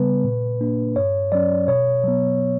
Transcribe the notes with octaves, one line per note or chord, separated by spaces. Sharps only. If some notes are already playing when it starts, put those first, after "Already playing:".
Already playing: C#3 G3 B3 B4
A#2
A#3 D4
G2 C#5
F#3 C#4 D5
B2 C#5
F#3 B3